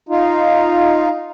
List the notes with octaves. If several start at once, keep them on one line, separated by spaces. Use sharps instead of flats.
D#4 F4